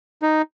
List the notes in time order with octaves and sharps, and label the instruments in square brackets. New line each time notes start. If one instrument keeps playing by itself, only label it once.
[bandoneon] D#4